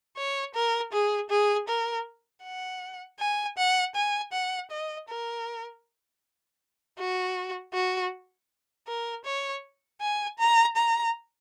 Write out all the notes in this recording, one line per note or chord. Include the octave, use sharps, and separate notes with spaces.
C#5
A#4
G#4
G#4
A#4
F#5
G#5
F#5
G#5
F#5
D#5
A#4
F#4
F#4
A#4
C#5
G#5
A#5
A#5